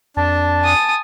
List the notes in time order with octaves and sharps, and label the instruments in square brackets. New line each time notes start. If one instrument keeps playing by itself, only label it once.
[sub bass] F2 [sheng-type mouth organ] D4 [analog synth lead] A5
[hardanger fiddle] G#5 D#6